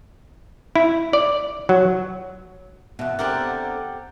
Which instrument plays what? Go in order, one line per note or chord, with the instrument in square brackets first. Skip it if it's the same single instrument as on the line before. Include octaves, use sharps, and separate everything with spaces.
[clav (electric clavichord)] E4
D5
F#3
[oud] E2 B2 [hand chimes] B3 E5 F#6
[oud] D3 C4 [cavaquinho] G4 A#4 F#5 [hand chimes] D6 F6 A6